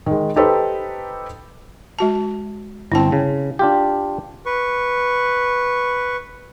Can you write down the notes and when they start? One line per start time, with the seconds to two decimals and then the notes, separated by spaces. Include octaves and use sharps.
0.06 D#3 G#3
0.36 D#4 G4 A4 B4 C5
1.99 G#3 F#4 A5
2.92 G1 C4 E4 A5
3.12 C#3
3.59 D4 F4 G4
4.46 B4 C#6